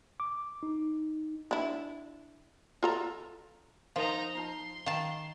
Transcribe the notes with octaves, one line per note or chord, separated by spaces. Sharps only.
D6
D#4
D4 E4
F4 A4 A#5
F3 D#4 A#4 F5 A#5
D#4 F4 A5 C6
D#3 F5 A5